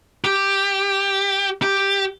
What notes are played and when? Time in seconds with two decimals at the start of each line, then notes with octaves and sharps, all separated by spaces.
0.25 G4
1.62 G4